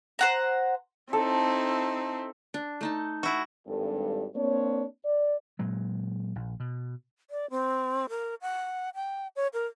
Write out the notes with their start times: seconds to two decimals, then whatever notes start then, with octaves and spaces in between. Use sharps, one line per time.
0.19 C5 F#5 A#5
1.13 C4 D#4 E4 A4
2.54 D4
2.81 A3 D#4 A5
3.23 E4 F#4
3.67 G#1 G2 A4
4.36 A#3 C4 D4 C#5
5.05 D5
5.59 A#2 F#3 G#3
6.36 A#1
6.60 B2
7.30 D5
7.50 C4
8.09 A#4
8.42 F#5
8.95 G5
9.36 C#5
9.53 A#4